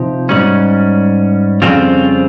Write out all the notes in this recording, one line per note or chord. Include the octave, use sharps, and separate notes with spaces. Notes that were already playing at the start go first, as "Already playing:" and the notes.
Already playing: C3 F3 D#4 G4
G#2 G3 C#4
F2 C#3 G3 C4 F4